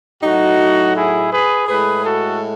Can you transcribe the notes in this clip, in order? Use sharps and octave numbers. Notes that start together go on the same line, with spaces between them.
A2 F#3 D#4 F#4
E4 G#4
G#4 B4
A2 G#3 G#4 B4
F#4 A4